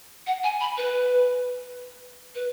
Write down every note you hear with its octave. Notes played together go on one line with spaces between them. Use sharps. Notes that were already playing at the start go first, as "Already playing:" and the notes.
F#5
G#5
B5
B4
B4